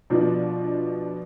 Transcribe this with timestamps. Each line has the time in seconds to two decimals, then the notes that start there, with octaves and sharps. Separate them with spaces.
0.10 B2 F3 D4